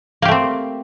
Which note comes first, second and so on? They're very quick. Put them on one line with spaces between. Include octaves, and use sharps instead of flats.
A#3 G4 A3 C4